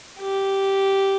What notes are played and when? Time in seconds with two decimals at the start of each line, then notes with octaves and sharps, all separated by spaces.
0.20 G4